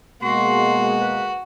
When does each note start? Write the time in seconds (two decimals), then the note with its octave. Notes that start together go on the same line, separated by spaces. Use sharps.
0.22 B2 G#3 A#3 F#4 C6
1.01 B4